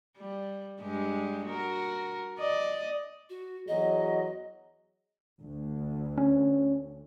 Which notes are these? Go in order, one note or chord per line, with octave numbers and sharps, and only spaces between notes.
G3
G2 G#3 G4
F#4 A#4
D5 D#5
F#4
E2 F#3 G#4 D#5
D2
C#4